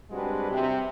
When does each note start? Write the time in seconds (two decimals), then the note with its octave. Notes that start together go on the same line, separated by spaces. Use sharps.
0.11 G3 G#3 C4 D4 F#4 B4
0.50 C3